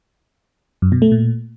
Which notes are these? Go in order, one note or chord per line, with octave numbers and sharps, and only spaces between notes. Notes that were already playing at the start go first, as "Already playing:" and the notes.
F#2
B2
A3
A#2